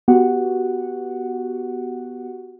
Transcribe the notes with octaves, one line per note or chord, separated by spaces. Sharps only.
B3 F#4 G4 F#5